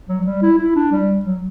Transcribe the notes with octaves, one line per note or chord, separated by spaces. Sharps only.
F#3
F#3
G3
E4
E4
D4
G3
F#3